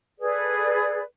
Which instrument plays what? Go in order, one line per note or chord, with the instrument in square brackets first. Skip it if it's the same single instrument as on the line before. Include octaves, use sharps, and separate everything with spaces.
[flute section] G#4 A4 B4 D5